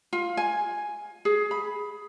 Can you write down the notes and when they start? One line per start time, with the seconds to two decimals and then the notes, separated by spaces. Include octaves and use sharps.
0.13 F4
0.37 G#5
1.25 G#4
1.51 B5